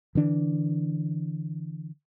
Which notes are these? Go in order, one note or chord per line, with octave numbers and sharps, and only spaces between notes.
D3 E3 D4